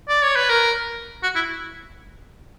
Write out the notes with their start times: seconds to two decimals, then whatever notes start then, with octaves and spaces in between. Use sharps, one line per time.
0.09 D5
0.23 C#5
0.36 B4
0.50 A#4
1.23 F#4
1.36 E4